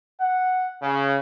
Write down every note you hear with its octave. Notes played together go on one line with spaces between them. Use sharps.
F#5
C#3